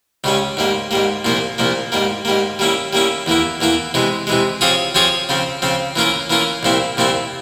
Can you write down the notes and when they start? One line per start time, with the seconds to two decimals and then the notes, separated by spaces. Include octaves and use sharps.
0.24 C#2 C#3 G3 C#4
0.57 G#2 G3 A#3
0.91 G#2 G3 A#3
1.25 C2 A#2 F3 A#3
1.58 C2 A#2 F3 A#3
1.92 G#2 G3 A#3
2.25 G#2 G3 A#3
2.59 G3 A#3 C#4 E4
2.93 G3 A#3 C#4 E4
3.26 E2 E3 A#3 E4
3.61 E2 E3 A#3 E4
3.94 C3 E3 G#3
4.27 C3 E3 G#3
4.61 F3 C4 F4 G#4 C#5
4.95 F3 C4 F4 G#4 C#5
5.29 C#3 F3 C4
5.62 C#3 F3 C4
5.96 E3 A#3 C#4 F4 A#4
6.30 E3 A#3 C#4 F4 A#4
6.63 C2 A#2 F3 C4 E4
6.97 C2 A#2 F3 C4 E4